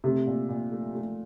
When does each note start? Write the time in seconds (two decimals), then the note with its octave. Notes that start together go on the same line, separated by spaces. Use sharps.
0.04 C3 A3
0.26 A#2
0.49 A#2
0.72 A3
0.95 A3